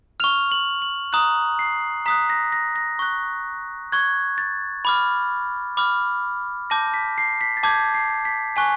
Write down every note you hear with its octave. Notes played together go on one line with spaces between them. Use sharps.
C#6 F6 F7
F#7
F#7
A#5 D#6 F#6 F#7
C7
A#5 D#6 F#6 B6
A#6
A#6
A#6
C#6 F#6
C#6 F#6 G#6
A6
B5 D6 F6
B5 D6 F6
A5 D6 G6 A#6
B6
C7
B6
A6
A5 D6 G6 G#6
C7
B6
G#5 C#6 F#6 B6